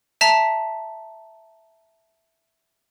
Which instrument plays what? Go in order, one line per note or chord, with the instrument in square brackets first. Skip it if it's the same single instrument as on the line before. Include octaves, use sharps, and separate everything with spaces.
[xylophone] E5 A5 A#5 B6